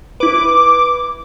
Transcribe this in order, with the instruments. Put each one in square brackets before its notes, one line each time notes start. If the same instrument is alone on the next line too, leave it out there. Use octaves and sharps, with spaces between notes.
[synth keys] E4 B4 [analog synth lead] D6